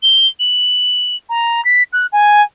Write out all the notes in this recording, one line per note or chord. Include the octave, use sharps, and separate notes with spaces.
G7
F#7
A#5
B6
F#6
G#5